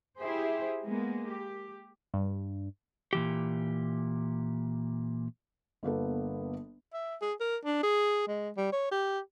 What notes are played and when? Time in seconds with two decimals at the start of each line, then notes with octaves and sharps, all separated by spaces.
0.20 E4 G4 G#4 C5 E5
0.85 G#3 A#3 B3
1.28 G4
2.14 G2
3.13 A#2 E3 G4
5.83 G1 A#3 B3 A4
6.94 E5
7.22 G#4
7.40 A#4
7.65 D4
7.83 G#4
8.28 G#3
8.57 G3
8.73 C#5
8.92 G4